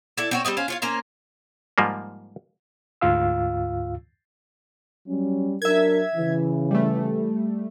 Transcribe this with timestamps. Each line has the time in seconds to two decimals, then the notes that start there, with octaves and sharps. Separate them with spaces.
0.18 E4 A4 D5
0.31 C4 F#4 C#5
0.45 G3 G#3 C4 D#5
0.57 C#4 C5 F5
0.68 F4 C#5 F5
0.82 A#3 C#4 C5 A#5
1.78 G#2 F3 G3 A#3
3.01 D2 G#2 F4 F5 E6
5.07 F#3 G3 C#4
5.62 F#3 D4 A#4 E5 G#6
6.16 C#3 E3
6.71 G3 A3